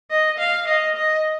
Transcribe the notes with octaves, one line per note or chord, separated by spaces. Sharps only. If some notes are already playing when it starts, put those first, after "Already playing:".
D#5
F5
D#5
D#5